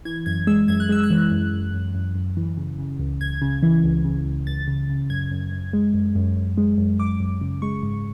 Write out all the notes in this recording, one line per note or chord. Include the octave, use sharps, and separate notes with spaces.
E3 G#6
F#2 G#6
G#3 E6
F#2 G#6
F#6
G#3 E6
F#6
E3
F#2
F#2
F#2
F#2
F#2
E3
C#3
C#3
C#2
C#2 G#6
C#3
E3
C#2
C#3
C#2
C#2 A6
C#3
C#3
F#2 G#6
F#2
F#2
G#3
F#2
F#2
F#2
G#3
F#2
F#2 D6
F#2
C#3
G#3 C#6
G#2